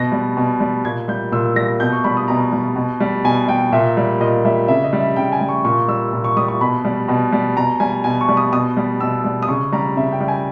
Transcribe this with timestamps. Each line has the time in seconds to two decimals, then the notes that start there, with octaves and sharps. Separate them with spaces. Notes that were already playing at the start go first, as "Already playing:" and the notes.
Already playing: B2 A#6
0.12 G3
0.37 B2
0.60 G3
0.85 A#2 G#6
1.08 G3 G6
1.32 A#2 E6
1.56 G3 A#6
1.80 B2 G6
1.92 C#6
2.04 G3 B5
2.17 D#6
2.28 B2 A#5
2.52 G3
2.76 B2
3.00 G3
3.25 B2 G#5
3.48 G3 G5
3.72 A#2 E5
3.97 G3
4.20 A#2 D#5
4.45 G3 E5
4.68 C#3 E5
4.84 D#5
4.93 G3
5.00 E5
5.16 C#3 G5
5.32 G#5
5.41 G3
5.49 C#6
5.65 A#2 C#6
5.88 G3 E6
6.13 A#2
6.24 C#6
6.37 G3 D#6
6.48 C#6
6.61 B2 B5
6.85 G3
7.08 B2
7.32 G3
7.57 B2 A#5
7.80 G3 G#5
8.04 B2 G#5
8.21 C#6
8.29 G3
8.37 D#6
8.52 B2 D#6
8.77 G3
9.00 B2 E6
9.24 G3
9.43 D#6
9.48 C#3 C#6
9.72 G3 A#5
9.97 C#3 E5
10.12 G5
10.20 G3
10.28 G#5